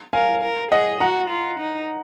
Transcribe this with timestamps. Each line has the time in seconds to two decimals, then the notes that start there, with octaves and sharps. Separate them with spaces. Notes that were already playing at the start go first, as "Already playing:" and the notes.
0.13 A#4 F5 G#5
0.43 A#4
0.72 G#4 D#5 F#5
1.00 F#4 F#5 A#5
1.30 F4
1.59 D#4